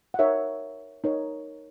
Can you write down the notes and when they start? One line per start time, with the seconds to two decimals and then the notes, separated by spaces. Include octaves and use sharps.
0.14 F#5
0.19 D#4 A#4 C#5 E5
1.04 D#4 A#4 C#5